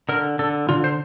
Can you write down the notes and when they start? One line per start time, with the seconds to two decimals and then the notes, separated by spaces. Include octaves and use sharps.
0.09 D3 A#4
0.39 D3 A4
0.69 D3 F4
0.84 C5